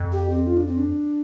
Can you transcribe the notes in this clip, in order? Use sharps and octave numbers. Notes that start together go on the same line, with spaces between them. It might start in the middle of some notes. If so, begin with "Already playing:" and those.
Already playing: F2
G4
C4
F4
D4
C4
D4